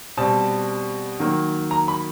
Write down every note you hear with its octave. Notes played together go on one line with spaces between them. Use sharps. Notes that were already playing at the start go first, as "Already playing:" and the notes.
B2 G3 C4 A5
D#3 F#3 A#3
A#5
B5